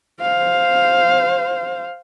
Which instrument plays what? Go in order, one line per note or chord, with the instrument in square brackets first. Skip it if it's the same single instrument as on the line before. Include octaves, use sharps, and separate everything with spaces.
[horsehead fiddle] C5 F5